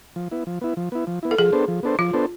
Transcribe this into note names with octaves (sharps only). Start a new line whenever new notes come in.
F3
B3 E4
F3
B3 E4
F3
B3 E4
F3
B3 E4
A4
F3 G#4
B3 D4 A4 C5
F3
B3 D4 A4 C5
F3 F4
B3 D4 A4 C5